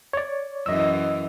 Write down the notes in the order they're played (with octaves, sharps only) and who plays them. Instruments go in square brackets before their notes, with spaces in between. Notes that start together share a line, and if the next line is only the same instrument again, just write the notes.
[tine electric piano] C#5 D5
[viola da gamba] F#2 E3 [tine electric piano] D#5 E6